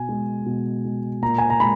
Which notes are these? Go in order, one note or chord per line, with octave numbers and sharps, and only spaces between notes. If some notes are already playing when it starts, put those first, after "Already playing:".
Already playing: B2 G#5
G#3
B2
G#3
A#2 A#5
G#5
A#5
G#3 B5